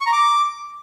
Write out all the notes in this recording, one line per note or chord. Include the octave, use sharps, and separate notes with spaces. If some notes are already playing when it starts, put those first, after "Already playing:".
C#6
A#5
D6